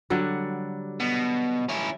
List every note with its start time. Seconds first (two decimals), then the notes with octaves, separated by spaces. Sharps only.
0.10 D3 F#3 G3
1.00 B2
1.69 C#4 E4